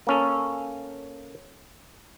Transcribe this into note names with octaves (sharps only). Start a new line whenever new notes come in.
A#3 C#4 A4